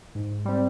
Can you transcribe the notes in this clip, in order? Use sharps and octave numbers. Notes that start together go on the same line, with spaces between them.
G#2
G3 C4